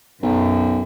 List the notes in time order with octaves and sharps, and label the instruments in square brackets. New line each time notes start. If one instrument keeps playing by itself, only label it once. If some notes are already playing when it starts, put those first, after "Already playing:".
[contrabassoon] B1 [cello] F#2